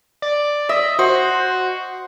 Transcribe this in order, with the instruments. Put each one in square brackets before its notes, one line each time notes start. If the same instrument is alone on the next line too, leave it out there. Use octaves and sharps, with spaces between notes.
[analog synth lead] D5
[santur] D#5 [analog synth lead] E5
[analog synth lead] F#4 [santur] C5